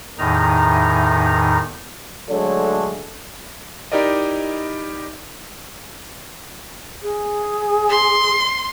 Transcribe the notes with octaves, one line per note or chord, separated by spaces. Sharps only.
E2 A2 D#3 D#4 A#5
D3 F#3 G#3 A3 A4 C#5
D#4 E4 G4 A#4 D5 D#5
G#4
C6